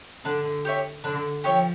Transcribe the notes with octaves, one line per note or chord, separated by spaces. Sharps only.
D3 D4
G4 C#5 E5
D3 D4
F3 G4 C#5 E5